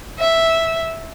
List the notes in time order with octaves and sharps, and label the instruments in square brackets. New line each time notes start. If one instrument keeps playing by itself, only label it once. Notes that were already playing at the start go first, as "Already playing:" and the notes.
[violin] E5